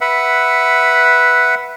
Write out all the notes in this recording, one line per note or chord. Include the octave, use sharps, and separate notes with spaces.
B4 E5 F#5